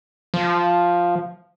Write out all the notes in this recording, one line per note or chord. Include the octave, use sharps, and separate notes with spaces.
F3